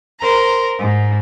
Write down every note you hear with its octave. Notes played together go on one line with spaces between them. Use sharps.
A#4 C5 A#5
G#2